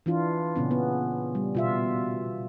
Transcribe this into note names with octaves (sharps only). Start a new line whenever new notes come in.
E3 D4 F4
A#2 C#3 B3 C#4
B3
G3
B2 F4 E5